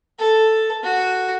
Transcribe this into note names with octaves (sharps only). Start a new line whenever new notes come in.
A4
F#4